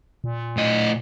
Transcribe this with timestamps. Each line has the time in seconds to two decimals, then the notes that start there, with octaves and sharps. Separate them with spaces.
0.24 A#2
0.57 A2 D#5